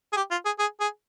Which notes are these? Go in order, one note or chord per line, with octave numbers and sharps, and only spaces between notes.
G#4
G4
F4
G#4
G#4
G#4